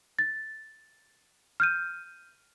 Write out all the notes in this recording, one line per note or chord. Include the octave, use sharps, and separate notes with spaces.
A6
F6 G6 D#7